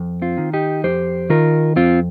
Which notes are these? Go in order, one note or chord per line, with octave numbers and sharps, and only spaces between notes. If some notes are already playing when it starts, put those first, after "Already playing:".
Already playing: F2
C4 F4
D#3
D#4 G4
F2 G4 C5
D#3 F4 A#4
F2 C4 F4